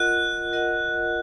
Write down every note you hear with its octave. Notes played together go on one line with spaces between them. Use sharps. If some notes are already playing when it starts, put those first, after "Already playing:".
Already playing: F4 A#4 D#5 F#5 F#6
F4 A#4 D#5 F#5